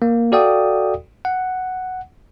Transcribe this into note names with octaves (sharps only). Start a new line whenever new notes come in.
A#3
F#4 A4 D5 F5 G5 D#6
F#5